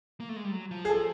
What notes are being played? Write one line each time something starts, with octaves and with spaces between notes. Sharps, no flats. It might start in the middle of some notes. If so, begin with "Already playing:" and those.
A#3
A3
G#3
G3
F#3
F3
G#4
A4